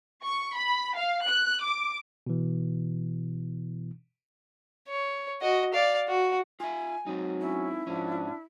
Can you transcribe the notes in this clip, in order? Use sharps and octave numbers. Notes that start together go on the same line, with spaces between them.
C#6
B5
F5
F#6
D6
B2 E3
C#5
F#4 D#5
D5 F5
F#4
F4 E5 G#5
F#3 C4 D#4
C#4 E4
G#2 F3 C#4 D4